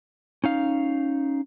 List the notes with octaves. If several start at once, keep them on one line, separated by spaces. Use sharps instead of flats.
C#4 D#4 F5